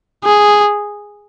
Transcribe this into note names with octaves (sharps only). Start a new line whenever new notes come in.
G#4